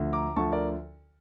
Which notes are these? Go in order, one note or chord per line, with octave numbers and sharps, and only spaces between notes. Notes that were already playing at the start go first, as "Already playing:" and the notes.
Already playing: D2 D3 F3
A#5 D6
D2 D3 F3 A5 C#6
A#4 D5